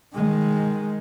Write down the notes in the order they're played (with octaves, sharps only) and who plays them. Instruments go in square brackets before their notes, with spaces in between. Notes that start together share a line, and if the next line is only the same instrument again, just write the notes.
[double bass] D#3 G#3